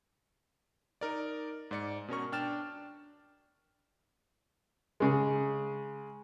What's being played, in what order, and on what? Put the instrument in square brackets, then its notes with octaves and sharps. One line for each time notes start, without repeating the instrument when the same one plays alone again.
[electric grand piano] D#4 A#4 D5
G#2 D5 C#7
B2 C#4 A#4 C#6
D4 G5 F6 A6 E7
[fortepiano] C#3 G#3